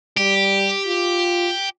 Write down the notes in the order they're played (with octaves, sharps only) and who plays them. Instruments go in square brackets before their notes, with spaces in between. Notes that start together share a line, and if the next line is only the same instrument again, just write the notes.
[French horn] G3 [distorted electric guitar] G4
[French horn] F4